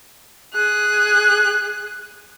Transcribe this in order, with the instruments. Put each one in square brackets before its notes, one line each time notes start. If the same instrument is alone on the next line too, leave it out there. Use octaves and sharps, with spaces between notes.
[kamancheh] G#4 F#6